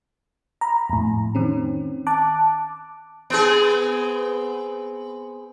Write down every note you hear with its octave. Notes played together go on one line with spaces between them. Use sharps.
A#5 B5
F2 A2
D#3 C4 C#4
A5 D6 F#6
B3 C4 G#4